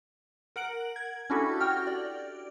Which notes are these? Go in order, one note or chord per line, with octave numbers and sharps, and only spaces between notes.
A#4 F#5 D7 F#7
G#6
C#4 D4 E4 F#4 G4 A4
F#4 G5 F6
D5